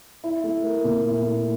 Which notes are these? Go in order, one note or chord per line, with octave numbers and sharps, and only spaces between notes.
E4
A3
A#4
A#2
E4
A3